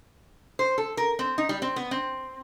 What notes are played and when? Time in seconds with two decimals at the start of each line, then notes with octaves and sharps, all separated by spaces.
0.59 C5
0.78 A4
0.97 A#4
1.19 C4
1.38 D#4
1.49 G3
1.62 C4
1.76 B3
1.91 C4